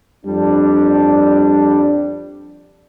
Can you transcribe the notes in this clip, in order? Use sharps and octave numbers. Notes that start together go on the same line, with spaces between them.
F2 G3 D4